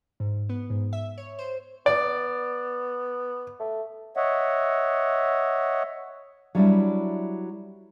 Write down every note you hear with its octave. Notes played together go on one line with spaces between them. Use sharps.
G#2
B3
G#2
E5
C#5
C5
B3 D5
A3
C#5 D#5 E5 F#5
F#3 G3 D4 E4